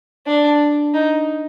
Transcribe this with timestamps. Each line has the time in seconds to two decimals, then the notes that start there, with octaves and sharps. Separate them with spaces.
0.27 D4
0.94 D#4